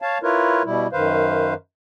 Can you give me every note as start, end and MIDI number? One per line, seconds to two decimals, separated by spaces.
0.02 0.18 73
0.02 0.18 77
0.02 0.18 81
0.23 0.62 64
0.23 0.62 65
0.23 0.62 70
0.23 0.62 71
0.23 0.62 73
0.65 0.87 47
0.65 0.87 55
0.65 0.87 64
0.93 1.54 42
0.93 1.54 51
0.93 1.54 71
0.93 1.54 72
0.93 1.54 77